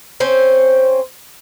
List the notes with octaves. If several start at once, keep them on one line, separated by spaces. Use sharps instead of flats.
C4 C#4 C5